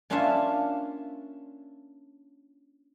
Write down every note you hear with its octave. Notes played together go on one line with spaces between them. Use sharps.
A#3 C#4 D4 F4 C#5 E5